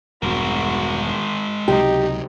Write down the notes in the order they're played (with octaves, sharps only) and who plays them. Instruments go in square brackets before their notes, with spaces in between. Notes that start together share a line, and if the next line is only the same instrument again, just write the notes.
[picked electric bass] E1 G2 B2 [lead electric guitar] G#3 A#4 [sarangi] F#4
[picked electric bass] C#2 C3 F#3 [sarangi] D#4 [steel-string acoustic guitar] G4